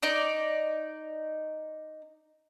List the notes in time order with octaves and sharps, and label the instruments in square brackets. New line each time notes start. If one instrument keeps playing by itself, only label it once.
[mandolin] D#4 D5